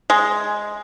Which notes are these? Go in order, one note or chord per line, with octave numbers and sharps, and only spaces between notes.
G#3